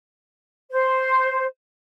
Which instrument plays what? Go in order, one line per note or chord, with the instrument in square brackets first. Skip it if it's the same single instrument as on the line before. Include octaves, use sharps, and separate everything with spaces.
[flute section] C5